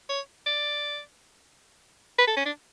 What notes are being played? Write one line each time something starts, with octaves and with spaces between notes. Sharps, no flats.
C#5
D5
B4
A4
C#4
D4